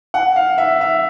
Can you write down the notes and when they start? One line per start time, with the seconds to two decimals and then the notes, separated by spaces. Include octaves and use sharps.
0.14 F#5
0.36 F5
0.58 E5
0.81 E5